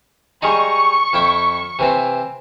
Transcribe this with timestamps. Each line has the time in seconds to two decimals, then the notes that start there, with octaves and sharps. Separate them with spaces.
0.42 G3 G#3 D#4 C#6
1.13 F2 E4 G5
1.79 C3 E3 C4